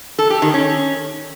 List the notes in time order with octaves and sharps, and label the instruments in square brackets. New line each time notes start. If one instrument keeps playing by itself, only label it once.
[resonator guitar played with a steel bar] A4
G4
D#3
C#4